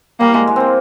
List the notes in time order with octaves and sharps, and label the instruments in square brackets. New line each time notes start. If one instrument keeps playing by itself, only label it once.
[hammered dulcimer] G3 [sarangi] A#3
[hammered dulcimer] G#3
G#3
A#3 C4